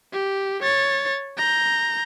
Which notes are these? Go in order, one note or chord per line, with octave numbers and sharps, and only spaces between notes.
G4
C#5 A6
A#5 G6